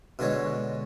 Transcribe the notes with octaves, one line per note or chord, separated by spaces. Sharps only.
B2 D3 G#3 C#5